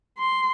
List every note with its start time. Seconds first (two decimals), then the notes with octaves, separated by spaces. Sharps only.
0.18 C6